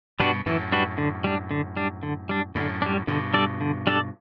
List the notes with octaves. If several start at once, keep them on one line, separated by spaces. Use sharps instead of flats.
G2 B2 G3 D4 F#4 B4
F#2 A2 E3
G3 D4 F#4 B4
D3
G3 D4
D3
G3 D4
D3
G3 D4
F#2 A2 D3
G3 D4
G2 B2 D3
G3 D4 A4 D5
D3
G3 D4 A4 D5